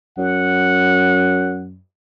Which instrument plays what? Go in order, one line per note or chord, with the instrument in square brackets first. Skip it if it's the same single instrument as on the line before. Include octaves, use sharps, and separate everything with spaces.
[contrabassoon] F#2 [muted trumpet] F#5